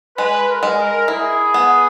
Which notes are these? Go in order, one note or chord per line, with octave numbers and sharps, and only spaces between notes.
G#3 B4
A#4
G#3
A#4
E4 G#4
B3